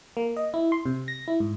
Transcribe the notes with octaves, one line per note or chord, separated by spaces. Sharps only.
A#3
D#5
E4
C6
C3
A#6
E4
G#2